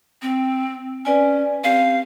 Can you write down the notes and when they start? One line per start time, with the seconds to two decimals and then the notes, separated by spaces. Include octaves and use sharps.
0.22 C4
1.05 C#4 B4 D5 G#5
1.64 C4 G4 F5